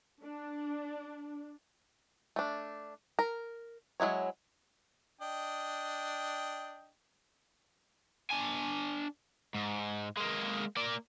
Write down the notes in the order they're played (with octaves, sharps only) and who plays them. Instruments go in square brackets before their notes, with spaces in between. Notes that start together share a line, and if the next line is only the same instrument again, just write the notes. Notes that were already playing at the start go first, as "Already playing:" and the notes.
[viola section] D4
[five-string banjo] A3 D4
A#4
F#3 G#3 E4 C#5
[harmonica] D4 D#5 G5
[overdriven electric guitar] D4 G#5
G#2
G#3 A#3
A#3 D5